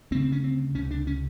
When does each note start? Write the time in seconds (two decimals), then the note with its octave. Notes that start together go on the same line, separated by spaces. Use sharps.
0.11 D2 C4
0.15 C#3
0.21 C4
0.32 C#4
0.44 C4
0.75 C#2 C3 C#4
0.91 D4
1.07 C#4